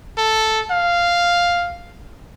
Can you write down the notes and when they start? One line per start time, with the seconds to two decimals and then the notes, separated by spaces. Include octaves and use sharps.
0.18 A4
0.71 F5